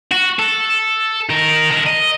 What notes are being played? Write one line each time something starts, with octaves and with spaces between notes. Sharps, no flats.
F#4
A4
D#3 A#4
D3 A#4
D#5